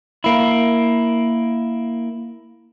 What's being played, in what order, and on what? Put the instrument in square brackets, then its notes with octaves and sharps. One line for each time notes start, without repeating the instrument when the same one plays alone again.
[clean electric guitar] A#3 E4